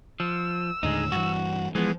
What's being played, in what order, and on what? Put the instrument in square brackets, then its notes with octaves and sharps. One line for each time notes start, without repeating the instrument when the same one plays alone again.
[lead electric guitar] F3 [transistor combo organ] E6
[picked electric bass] D#2 A2 D3 [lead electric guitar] G#3 D#4
[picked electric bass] G2 E3 [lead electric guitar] F#4
[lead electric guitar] E3 B3 [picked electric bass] F3 [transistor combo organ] G#3